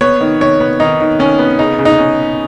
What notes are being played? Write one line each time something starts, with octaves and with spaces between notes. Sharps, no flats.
B3 C#5
D#3
D#3 C#5
B3
D#3 D#4
D#3
D#3 C#4
B3
C#3 D#4
C#3
D#4
C#4